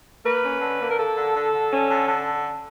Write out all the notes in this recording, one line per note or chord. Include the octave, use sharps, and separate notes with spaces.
A#3 B4
C#4
D3
A#3
A#4
A#3 A4
D3
D3
D3
C#4
D3
D3